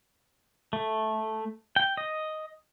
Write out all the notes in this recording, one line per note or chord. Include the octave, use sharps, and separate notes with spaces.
A3
G5
D#5